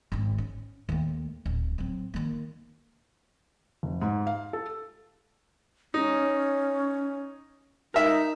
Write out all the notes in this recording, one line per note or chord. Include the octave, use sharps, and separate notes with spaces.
G#1 C#4
C#4
D#2 A3
D1
F#3 C4
D#3 A#3
F1
G#2
F5
A4
C#4 D#4
D#4 A#4 E5